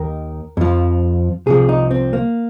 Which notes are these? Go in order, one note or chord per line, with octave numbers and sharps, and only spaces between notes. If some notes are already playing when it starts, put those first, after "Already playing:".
Already playing: D#2 D#3 A#4
F2 F3
C2 C3 F3 G#4
D#4
C4
A#3